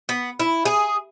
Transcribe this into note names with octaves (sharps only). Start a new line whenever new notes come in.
B3
E4
G#4